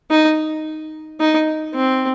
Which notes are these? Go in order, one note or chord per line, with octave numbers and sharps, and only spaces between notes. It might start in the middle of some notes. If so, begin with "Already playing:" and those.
D#4
D#4
C4